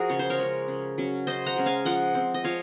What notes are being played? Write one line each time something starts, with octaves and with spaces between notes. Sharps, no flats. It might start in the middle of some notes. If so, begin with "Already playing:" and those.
Already playing: F3 F#4 G#4 A#4
C#3 C#5
C5
A#4 C#5
G#3 C#4
C#3
F#3 C#4
C#3 C5 D#5
F#5 A#5
G#3 C#4
F5 G#5
F3 D#5 F#5
C4
D#5
F3 C#5 F5